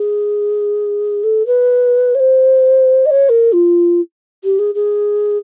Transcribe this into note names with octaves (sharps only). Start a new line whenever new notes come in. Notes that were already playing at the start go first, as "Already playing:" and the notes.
Already playing: G#4
A4
B4
C#5
C5
D#5
C#5
A#4
F4
G4
G#4
G#4